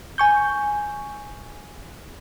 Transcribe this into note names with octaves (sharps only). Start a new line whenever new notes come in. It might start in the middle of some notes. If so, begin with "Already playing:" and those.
G#5 C#6 G6